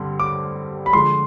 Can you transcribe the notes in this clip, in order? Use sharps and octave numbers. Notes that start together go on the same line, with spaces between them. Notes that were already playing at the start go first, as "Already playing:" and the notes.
Already playing: G2 D3 G3 C4
D6
B5
D3 F3 G#3 C6